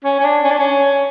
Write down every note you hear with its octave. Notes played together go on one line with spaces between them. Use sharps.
C#4
C#4
D4
C#4
D4
C#4